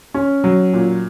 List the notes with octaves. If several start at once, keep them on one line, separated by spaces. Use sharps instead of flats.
C#4
F#3
A#2